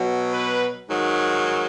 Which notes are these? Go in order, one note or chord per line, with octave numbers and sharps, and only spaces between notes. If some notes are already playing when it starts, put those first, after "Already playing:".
Already playing: B2 F#3
B4
G#2 D#3 F#3